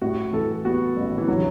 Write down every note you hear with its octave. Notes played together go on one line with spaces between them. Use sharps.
A2 F#4
E3 A4
B3 F#4
A1
E3
D3 F#3